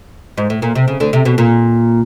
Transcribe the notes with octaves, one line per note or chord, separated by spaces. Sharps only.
G#2
A2
A#2
C3
C#3
D2 D3
C3
B2
A#2